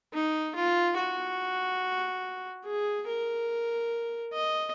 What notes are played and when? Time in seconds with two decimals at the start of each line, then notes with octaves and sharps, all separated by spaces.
0.13 D#4
0.55 F4
0.97 F#4
2.65 G#4
3.07 A#4
4.33 D#5